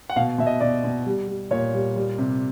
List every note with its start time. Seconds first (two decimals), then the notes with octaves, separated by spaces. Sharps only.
0.10 F#5
0.16 B2 F5
0.38 B2 E5
0.47 D#5
0.61 B2 D5
0.84 B2
1.06 G3
1.28 G3
1.51 A#2 C#5
1.74 G3
1.96 G3
2.18 C3